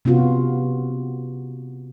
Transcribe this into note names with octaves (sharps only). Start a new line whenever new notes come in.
C3 B3 C#4 F4 F#4